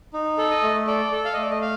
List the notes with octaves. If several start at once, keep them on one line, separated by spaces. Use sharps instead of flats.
D#4
A4
D#5
A3
A4 D5
A4
F5
D#5
A3
D5
D#5
F5